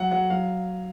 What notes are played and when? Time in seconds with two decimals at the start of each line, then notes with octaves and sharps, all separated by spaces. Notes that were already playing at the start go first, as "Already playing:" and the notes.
Already playing: F#3 F#5
0.11 F#3 F#5
0.30 F#3 F5